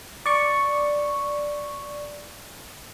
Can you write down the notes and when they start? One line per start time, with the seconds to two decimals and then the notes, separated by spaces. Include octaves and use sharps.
0.26 D5 C#6